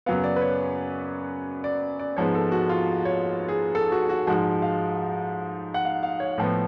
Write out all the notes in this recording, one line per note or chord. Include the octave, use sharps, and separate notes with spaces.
F#2 C#3 F#3 B3 F5
D5
B4
C#5
D5
D5
G#2 F3 G#3 B3 C#5
A4
F#4
F4
C#5
G#4
A4
F#4
F#4
G#2 F3 G#3 F#4
F5
F#5
F5
F5
C#5
A2 F3 B3